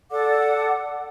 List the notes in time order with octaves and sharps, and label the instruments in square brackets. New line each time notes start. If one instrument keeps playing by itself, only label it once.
[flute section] A4 D5 F#5 D6